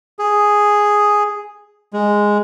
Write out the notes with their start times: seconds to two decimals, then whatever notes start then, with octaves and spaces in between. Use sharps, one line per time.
0.19 G#4
1.93 G#3